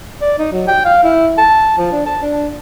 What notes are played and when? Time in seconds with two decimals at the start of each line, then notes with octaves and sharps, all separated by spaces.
0.22 D5
0.39 D#4
0.52 F#3
0.68 G5
0.85 F5
1.04 E4
1.38 A5
1.78 F3
1.93 D4
2.06 A5
2.23 D4